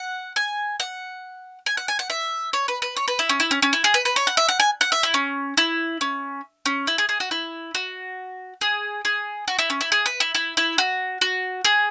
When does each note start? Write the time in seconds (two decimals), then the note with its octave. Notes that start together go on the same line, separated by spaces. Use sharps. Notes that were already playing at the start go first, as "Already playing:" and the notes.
Already playing: F#5
0.36 G#5
0.80 F#5
1.66 G#5
1.77 F#5
1.88 G#5
1.99 F#5
2.10 E5
2.53 C#5
2.68 B4
2.82 B4
2.97 C#5
3.08 B4
3.19 E4
3.29 C#4
3.40 E4
3.51 C#4
3.62 C#4
3.73 E4
3.84 G#4
3.94 B4
4.05 B4
4.16 C#5
4.27 F#5
4.37 E5
4.49 F#5
4.60 G#5
4.81 F#5
4.92 E5
5.03 E4
5.14 C#4
5.57 E4
6.01 C#4
6.66 C#4
6.87 E4
6.98 G#4
7.09 G#4
7.20 F#4
7.31 E4
7.75 F#4
8.61 G#4
9.05 G#4
9.48 F#4
9.59 E4
9.70 C#4
9.81 E4
9.92 G#4
10.06 B4
10.20 E4
10.35 E4
10.57 E4
10.78 F#4
11.21 F#4
11.65 G#4